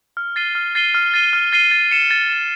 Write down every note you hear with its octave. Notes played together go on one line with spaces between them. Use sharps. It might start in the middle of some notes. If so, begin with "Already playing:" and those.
F6
A6 C7 D#7 G7
F6
A6 C7 D#7 G7
F6
A6 C7 D#7 G7
F6
A6 C7 D#7 G7
A6
C#7 E7
A6
C#7 E7